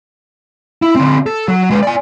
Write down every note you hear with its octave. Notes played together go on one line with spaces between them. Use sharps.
E4
D3 C4
A4
F#3
G#3 B4
D5 G#5